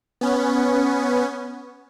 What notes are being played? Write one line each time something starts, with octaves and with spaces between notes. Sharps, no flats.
B3 C#4